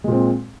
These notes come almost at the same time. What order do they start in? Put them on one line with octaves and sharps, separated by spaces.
G#3 A#2 C4